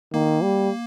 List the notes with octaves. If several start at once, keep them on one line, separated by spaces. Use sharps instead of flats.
D#3 A#3
G3